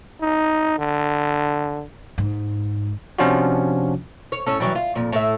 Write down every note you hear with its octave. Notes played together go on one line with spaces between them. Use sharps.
D#4
D3
G#2
C3 F3 C#4 D4 F4 F#4
C#5
A2 C#4 A4
E3 F#3 G3
F4
F2 A#2
A2 E5